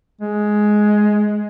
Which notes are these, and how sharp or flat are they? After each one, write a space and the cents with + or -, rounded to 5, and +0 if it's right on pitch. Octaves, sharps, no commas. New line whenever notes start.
G#3 +10